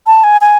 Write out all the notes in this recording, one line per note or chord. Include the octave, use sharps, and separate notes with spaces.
A5
G#5
G#5